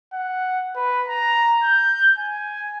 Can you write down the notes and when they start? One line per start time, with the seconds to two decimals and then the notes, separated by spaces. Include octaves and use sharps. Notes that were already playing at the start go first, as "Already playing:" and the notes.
0.14 F#5
0.76 B4
1.08 A#5
1.64 G6
2.18 G#5